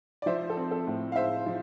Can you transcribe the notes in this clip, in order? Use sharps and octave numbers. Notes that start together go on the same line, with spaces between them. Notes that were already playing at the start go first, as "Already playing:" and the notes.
D5
F3 C5 E5
A4
C4
A4
A2
F5
G#3 C5 E5
F3